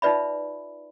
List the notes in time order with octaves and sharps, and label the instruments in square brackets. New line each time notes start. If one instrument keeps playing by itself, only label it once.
[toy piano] D#4 F4 B4 D5 E5 B5